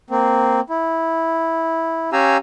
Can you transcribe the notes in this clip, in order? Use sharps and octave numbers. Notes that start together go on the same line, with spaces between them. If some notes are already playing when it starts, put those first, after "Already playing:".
A#3 C4
E4
C#4 G4 F5 G#5 A#5 E6